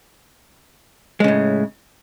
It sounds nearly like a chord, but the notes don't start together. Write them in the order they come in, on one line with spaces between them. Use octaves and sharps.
G#3 C#3 A2